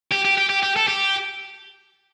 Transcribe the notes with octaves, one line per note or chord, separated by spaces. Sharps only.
G4
G4
G4
G4
G4
A4
G4